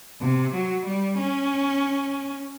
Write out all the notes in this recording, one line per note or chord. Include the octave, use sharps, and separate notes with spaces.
C3
F#3
G3
C#4